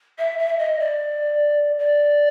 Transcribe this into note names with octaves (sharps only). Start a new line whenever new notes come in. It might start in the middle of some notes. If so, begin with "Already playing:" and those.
E5
E5
D#5
D5
D5